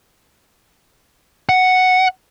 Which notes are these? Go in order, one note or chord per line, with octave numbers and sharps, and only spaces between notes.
F#5